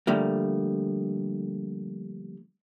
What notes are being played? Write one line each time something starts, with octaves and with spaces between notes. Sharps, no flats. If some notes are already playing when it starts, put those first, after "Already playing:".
D3 F3 G3 A3 A#3